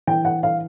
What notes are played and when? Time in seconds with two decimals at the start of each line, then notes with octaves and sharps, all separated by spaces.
0.07 E3 G5
0.25 F#5
0.43 F5